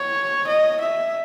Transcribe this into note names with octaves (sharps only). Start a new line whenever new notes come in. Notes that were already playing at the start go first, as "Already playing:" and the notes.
Already playing: C#5
D#5
E5